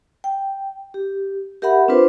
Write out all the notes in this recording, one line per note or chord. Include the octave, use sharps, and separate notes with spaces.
G5
G4
G4 A#4 E5 F#5 B5
C4 D4 F4 B4 C5